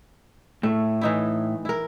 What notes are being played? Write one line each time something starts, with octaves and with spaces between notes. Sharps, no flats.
A2 A3
E3 D#4 E4
E4 A#4